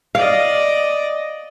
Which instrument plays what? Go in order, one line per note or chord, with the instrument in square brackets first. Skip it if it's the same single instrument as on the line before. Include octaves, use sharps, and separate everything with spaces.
[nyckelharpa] D5 D#5 [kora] F5